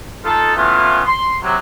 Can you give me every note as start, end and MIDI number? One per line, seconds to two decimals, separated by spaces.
0.24 0.56 63
0.24 0.56 65
0.24 0.56 69
0.56 1.01 52
0.56 1.01 57
0.56 1.01 59
0.56 1.01 61
0.56 1.01 64
0.56 1.01 65
1.06 1.36 84
1.42 1.56 48
1.42 1.56 54